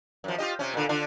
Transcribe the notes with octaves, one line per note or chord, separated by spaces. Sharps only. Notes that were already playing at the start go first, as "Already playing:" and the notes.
F#2 F3
F4 G4 D#5
C3 C#4
A#2 D3
D3 D4 F4